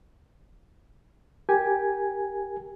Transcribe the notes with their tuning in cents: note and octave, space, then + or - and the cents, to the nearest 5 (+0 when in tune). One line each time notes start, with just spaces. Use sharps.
G4 +0 A#4 +0 G#5 +0